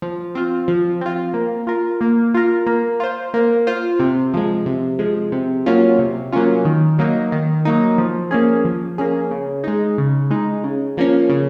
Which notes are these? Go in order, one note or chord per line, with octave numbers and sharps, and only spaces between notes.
F3
C4 F4
F3
C4 F4
A#3
F4 A#4
A#3
F4 A#4
A#3
F4 C5
A#3
F4 C5
C3
F3 G#3
C3
F3 G#3
C3
F#3 A#3 C#4 F4
C3
F#3 A#3 C#4 F4
D#3
F#3 A#3 D#4
D#3
F#3 A#3 D#4
F3
A#3 C#4 G#4
F3
A#3 C#4 G#4
C#3
G#3 D#4
C#3
G#3 D#4
C#3
F3 A#3 C#4
C#3